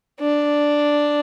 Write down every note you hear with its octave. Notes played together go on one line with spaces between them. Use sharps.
D4